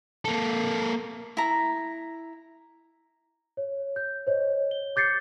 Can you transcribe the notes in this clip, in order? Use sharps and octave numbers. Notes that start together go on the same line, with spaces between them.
A#3 A4
E4 A#5
C#5
G6
C5 C#5 D#5
G7
D6 G6 A6 C7 C#7